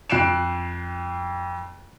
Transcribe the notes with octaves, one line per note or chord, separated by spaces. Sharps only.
F2 F#6 C7 D7 E7